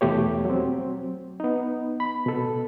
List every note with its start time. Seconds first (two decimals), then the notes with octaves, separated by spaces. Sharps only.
0.01 E2 B2 A3 G4 C#5
0.45 F#3 C4
1.40 B3 D#4
2.00 B5
2.26 B2 A4